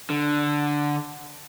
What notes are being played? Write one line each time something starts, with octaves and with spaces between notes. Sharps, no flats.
D3